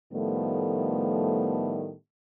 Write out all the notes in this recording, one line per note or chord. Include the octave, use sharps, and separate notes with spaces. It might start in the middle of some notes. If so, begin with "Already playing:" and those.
A2 D#3 F3 G3 A3 B3